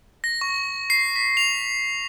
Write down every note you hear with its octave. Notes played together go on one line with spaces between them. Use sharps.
A#6
C#6
C7
B6
F7